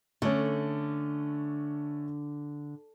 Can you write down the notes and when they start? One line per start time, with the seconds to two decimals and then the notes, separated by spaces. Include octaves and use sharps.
0.22 D3 A3 C#4